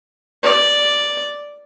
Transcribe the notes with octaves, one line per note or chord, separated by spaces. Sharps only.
D5